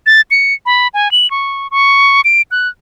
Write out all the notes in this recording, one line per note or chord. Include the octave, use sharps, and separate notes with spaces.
A6
C#7
B5
G#5
F#7
C#6
C#6
D7
F#6